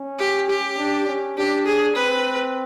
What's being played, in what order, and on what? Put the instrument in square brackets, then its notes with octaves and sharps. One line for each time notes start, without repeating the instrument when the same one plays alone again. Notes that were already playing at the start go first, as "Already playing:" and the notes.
Already playing: [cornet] C#4
[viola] G4
G4
[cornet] D4
C#4
[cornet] D4 [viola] G4
[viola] G#4
[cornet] C4 [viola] B4